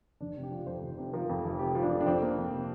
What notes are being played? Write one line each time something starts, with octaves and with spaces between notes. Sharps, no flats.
F1 D4
C3
G4
F3
F2 C5
F1
C3
F3 A#4
F2
F1
C3 G4
F3
D4
F2
D4
F2 C4
A#3
F2
C3